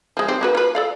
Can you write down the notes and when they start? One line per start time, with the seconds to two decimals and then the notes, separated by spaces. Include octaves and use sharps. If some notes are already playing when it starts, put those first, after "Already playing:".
0.17 F3 G#3
0.28 G3 C4 D#4
0.41 A#3 F#4 B4
0.55 F4 B4
0.75 A4 D5 F5